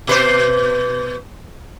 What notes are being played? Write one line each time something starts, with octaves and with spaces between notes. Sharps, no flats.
B2 B4 C5